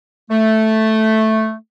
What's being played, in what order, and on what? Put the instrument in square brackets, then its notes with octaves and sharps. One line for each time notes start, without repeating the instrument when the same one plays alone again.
[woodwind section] A3